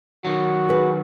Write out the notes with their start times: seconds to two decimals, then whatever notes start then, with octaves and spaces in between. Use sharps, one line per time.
0.25 D#3 F#3 F#4
0.69 G#4 B4